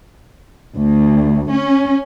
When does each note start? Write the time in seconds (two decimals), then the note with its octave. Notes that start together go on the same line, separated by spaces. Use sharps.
0.77 D2
1.52 C#4